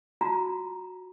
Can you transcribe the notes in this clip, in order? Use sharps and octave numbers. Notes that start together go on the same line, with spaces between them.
F4 F#4 A5 A#5